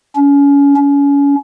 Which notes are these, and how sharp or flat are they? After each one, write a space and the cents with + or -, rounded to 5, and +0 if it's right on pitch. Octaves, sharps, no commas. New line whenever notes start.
C#4 +30
C#4 +30